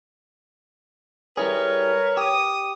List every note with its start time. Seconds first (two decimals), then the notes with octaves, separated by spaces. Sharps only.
1.37 G3 E4 G#4 A#4 B4 C#5
2.17 G4 D#6